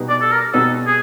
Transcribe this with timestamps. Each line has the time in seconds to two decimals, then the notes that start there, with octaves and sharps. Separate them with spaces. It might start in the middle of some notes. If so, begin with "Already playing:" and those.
Already playing: B2 G3 B3 D#4
0.09 D5
0.21 A4
0.31 A#4
0.53 B2 G3 B3 D#4 A4
0.87 G#4